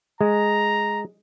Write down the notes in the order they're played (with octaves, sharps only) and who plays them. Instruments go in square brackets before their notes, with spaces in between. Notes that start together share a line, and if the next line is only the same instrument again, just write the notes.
[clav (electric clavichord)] G#3 [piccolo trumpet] A#5